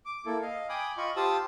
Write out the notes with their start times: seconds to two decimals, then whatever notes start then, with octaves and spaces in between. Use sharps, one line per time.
0.06 D6
0.26 A#3 E4 A4
0.42 D#5 F5
0.69 G5 G#5 B5 D6 D#6
0.98 F4 D#5 B5 C#6
1.16 F4 G4 C5 A5 D#6 E6